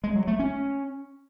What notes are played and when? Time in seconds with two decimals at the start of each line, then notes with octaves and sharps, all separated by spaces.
0.04 G#3
0.16 F#3
0.27 A3
0.39 C#4